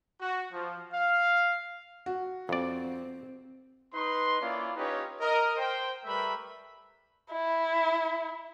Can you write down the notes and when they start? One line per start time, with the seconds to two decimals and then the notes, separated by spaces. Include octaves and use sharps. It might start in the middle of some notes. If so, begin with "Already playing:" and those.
0.20 F#4
0.52 F3
0.92 F5
2.06 F#4
2.49 F2 C4 D5
3.93 D#4 B4 C6
4.40 A#3 C#4 E4 F4 D5
4.76 C#4 D#4 F4 G4 B4 C#5
5.20 A#4 D#5
5.57 C5 G5
6.05 G3 A3 A#4 B4 E5 B5
7.32 E4